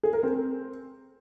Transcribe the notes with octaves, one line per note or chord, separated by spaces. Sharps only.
G#4
A#4
C4